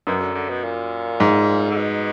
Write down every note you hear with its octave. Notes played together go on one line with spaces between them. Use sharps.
F#2 B2
D3
D3
B2
A#2
G#2
D3
B2